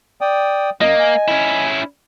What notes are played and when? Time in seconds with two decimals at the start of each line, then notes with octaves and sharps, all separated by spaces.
0.21 D5 G5 D#6
0.81 F#2 A#3 D#5
0.99 G#5
1.28 C#4 E4